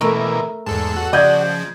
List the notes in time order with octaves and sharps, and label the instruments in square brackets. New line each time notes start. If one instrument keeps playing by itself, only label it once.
[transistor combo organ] B2 E3 A#3 [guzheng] A3 A#4 E5
[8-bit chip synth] E2 A4 A5 [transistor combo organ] G#2
[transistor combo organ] F#4
[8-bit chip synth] C#3 F3 [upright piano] D5 G6 G#6 [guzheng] D#5